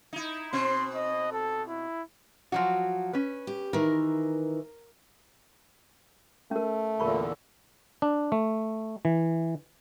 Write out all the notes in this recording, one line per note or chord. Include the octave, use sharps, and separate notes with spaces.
D#4 E4
B2 C4 C6
D#5
A4
E4
F3 F#3 F#4
C#4 B4
G4
D#3 E3 A#4
A3 C#4 A#4
E2 A#2 D3 A#4 B5 C#6
D4
A3
E3